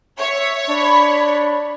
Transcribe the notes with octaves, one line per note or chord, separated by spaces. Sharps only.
C#5 E5
D4 B5